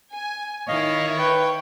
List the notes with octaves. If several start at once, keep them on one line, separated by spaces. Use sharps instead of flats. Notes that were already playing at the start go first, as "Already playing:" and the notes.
G#5
D#3 E4 C#5 D#5 F5
B4 G5